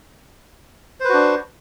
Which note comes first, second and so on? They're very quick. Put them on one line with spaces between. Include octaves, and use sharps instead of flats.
C5 B4 F#4 D4